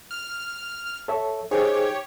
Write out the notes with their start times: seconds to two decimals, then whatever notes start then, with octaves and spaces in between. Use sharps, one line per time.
0.11 F6
1.08 A4 C#5 E5
1.51 D#4 G4 G#4 C5 C#5